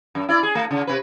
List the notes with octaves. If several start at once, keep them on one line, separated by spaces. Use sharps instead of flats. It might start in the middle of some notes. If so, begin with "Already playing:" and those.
F#2
E4 D5
G#4
A3
C#3
C3 B4